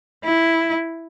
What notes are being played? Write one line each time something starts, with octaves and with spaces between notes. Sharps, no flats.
E4